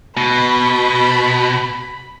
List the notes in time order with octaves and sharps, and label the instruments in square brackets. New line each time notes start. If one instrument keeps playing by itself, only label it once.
[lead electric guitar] B2 [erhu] B5